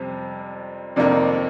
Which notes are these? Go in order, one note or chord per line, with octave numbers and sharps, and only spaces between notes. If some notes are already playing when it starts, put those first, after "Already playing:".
Already playing: F2 C3 G3 C4
F2 C3 D#3 A#3 D4